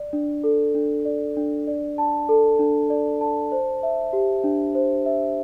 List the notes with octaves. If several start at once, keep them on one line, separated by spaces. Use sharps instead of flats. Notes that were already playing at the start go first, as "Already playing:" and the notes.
Already playing: D5
D4
A4
D4
D5
D4
D5
A5
A4
D4
D5
A5
C5
E5
G4
D4
C5
E5